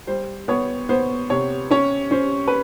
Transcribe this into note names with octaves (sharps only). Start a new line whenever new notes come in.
G3 C5
B3 C#5
B3 C5
C3 C#5
C#4 C#5
C#4 C5
B4